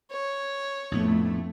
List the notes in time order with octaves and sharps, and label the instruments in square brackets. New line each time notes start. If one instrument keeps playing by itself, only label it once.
[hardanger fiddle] C#5
[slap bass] A#1 A2 B3 [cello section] F2 A3